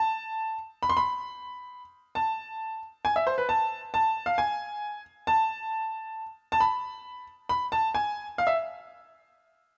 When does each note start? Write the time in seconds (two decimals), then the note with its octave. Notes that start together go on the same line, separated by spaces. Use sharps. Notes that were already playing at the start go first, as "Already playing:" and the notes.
Already playing: A5
0.83 B5
0.89 C6
0.97 B5
2.15 A5
3.05 G#5
3.16 E5
3.27 C5
3.38 B4
3.49 A5
3.94 A5
4.26 F5
4.38 G#5
5.27 A5
6.52 A5
6.60 B5
7.49 B5
7.72 A5
7.95 G#5
8.38 F5
8.47 E5